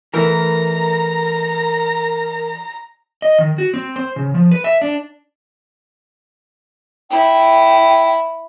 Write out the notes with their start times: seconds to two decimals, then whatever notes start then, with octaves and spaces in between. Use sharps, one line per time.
0.14 E3 A3 A#4 A#5
3.22 D#5
3.39 D#3
3.58 F#4
3.74 C4
3.96 C5
4.16 C#3
4.34 F3
4.51 B4
4.64 E5
4.82 D4
7.11 E4 G5